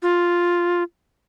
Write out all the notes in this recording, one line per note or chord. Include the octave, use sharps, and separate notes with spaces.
F4